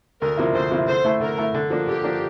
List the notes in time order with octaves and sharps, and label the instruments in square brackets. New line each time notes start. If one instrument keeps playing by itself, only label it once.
[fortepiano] D2 [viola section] A#4
[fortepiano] C3 F3 A#3 E4
[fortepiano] D2 [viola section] C5
[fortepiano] C3 F3 A#3 E4
[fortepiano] D3 [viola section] C5
[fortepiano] A3 E4 A4
[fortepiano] D3 [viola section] A#4
[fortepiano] A3 E4 A4
D3
F3 A#3 D4
[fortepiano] D3 [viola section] G4
[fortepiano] F3 A#3 D4